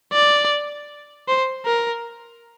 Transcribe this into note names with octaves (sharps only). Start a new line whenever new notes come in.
D5
C5
A#4